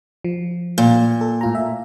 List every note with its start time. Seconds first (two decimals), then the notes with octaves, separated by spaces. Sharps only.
0.24 F3
0.78 A#2
1.21 A4
1.41 A2 F4 A#5
1.55 E5